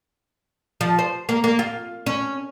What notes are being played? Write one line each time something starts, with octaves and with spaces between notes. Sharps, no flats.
F3
C5
A#3
A#3
F4
C#4